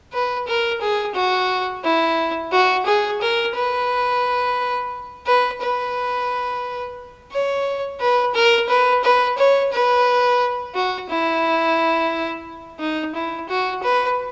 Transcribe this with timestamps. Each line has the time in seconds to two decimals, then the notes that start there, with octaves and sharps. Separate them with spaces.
0.13 B4
0.47 A#4
0.81 G#4
1.15 F#4
1.84 E4
2.52 F#4
2.86 G#4
3.21 A#4
3.55 B4
5.27 B4
5.61 B4
7.32 C#5
8.00 B4
8.34 A#4
8.69 B4
9.04 B4
9.38 C#5
9.72 B4
10.74 F#4
11.09 E4
12.80 D#4
13.15 E4
13.49 F#4
13.83 B4